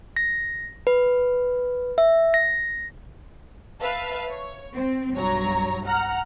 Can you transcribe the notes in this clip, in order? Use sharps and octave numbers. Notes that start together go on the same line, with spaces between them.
A#6
B4
E5
A#6
B4 E5 F5 A5
C#5
C4
B1 G2 F#3 C#5 A#5
F#5 A#5 F6